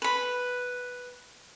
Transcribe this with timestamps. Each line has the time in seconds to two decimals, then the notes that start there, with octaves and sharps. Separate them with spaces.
0.02 B4 B5